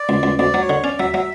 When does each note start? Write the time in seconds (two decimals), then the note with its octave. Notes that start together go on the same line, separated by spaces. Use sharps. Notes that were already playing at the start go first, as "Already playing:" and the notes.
Already playing: D5
0.09 C#2
0.23 C#2
0.38 D2 D5
0.54 F#3
0.61 C#5
0.70 D3
0.83 C#4 D5
0.99 F#3 E5
1.14 F#3 E5